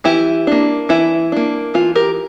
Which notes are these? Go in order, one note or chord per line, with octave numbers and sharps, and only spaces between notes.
E3 E4 G4
A#3 D4
E3 E4
A#3 D4
E3 F4
G4 A#4